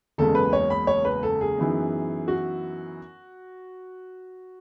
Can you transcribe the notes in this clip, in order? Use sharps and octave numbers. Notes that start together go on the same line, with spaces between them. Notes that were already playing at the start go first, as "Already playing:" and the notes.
F#1 E2 C#3 G#3 A4
B4
C#5
B5
C#5
B4
A4
G#4
F#2 E3 B3 D#4
F#4